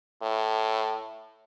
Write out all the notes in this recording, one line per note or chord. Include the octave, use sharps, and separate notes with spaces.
A2